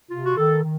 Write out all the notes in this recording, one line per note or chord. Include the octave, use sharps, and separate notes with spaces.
C3 F4
F#4
D#3 A4
D#3